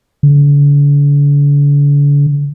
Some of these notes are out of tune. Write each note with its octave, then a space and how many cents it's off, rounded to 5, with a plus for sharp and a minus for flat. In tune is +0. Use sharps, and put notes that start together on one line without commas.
D3 -40